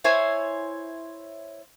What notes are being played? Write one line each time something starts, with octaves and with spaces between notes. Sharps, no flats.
E4 C5 C#5 G#5